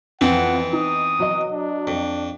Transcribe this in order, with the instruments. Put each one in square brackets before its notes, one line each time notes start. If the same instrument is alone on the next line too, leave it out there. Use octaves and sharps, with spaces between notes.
[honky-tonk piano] F2 [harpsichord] E3 B3 C4 [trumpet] F#5
[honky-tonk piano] D#4 [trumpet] D#6
[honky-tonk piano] F#3 D#5
[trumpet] D4
[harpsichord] F2